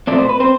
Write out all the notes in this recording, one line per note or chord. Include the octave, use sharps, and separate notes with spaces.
B2 A3 C4 D5
C5
B4
C4 C5